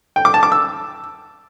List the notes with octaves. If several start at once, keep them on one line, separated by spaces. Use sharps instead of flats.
G5
D6
A5
D6
E6